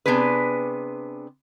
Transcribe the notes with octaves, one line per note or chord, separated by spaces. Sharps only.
C3 B3 D4 G#4 B4